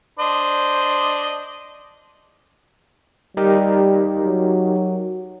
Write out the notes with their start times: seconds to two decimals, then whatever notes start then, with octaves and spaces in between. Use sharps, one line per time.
0.19 D4 C5 D#5
3.37 G3 D#4 G4 A#4
4.23 F#3